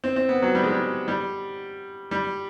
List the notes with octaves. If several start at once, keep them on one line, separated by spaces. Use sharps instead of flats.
C4
C4
B3
F#3
G3
G#3
G3
G3
G3